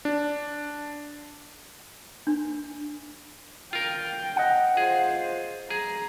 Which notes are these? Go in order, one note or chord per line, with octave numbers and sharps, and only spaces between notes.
D4
D4
F4 A#4 G5
D#5 F#5
F4 G#4 C5
G#4 A#5